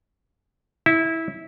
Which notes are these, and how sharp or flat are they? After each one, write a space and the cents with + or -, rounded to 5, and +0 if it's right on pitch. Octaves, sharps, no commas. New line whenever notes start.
E4 -20